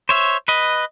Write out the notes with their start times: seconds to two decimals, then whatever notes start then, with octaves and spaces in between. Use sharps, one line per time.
0.09 C5 C#5 E5
0.48 B4 D#5